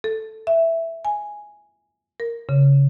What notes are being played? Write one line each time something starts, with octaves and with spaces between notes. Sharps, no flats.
A4
E5
G#5
A#4
C#3